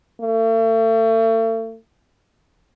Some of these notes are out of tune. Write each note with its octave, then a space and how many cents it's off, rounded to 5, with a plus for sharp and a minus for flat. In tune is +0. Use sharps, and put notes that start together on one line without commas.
A3 +40